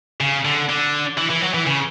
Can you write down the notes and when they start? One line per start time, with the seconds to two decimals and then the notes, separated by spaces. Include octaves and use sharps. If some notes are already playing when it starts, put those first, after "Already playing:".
0.20 C#3
0.45 D3
0.69 D3
1.18 E3
1.30 E3
1.42 F#3
1.54 E3
1.67 C#3